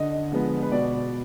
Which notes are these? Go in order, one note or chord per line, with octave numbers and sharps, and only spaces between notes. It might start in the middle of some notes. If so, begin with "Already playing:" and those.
Already playing: D3 D#5
F3 G#3 B3
B4
B2 D5